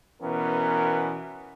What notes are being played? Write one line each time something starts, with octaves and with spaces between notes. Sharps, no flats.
B2 E3 B3 C#4 A#4